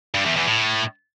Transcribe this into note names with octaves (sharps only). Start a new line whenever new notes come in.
G2
E2
E2
A2